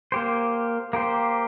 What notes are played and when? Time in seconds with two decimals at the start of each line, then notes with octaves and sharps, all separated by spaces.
0.12 A#3 G4 C5
0.93 A#3 G4 C5